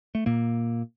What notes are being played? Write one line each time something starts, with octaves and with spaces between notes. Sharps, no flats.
A3
A#2 A#3